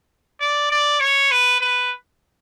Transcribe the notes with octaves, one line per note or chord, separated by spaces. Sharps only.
D5
D5
C#5
B4
B4